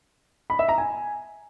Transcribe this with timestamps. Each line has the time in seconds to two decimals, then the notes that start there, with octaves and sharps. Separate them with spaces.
0.50 B5
0.59 E5
0.69 A#5
0.78 G#5